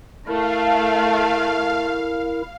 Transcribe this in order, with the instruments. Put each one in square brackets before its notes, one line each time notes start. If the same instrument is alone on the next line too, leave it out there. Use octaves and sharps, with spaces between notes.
[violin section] A3 [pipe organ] E4 A#4 [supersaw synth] F5